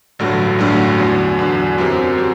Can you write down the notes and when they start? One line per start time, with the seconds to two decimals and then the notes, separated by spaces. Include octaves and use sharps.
0.19 A1 G2 D3 F#3 A3
0.59 A1 G2 D3 F#3 A3
0.98 E2 D3 F#3
1.39 E2 D3 F#3
1.78 F#2 F#3 C4 G4 C5
2.18 F#3 C4 G4 C5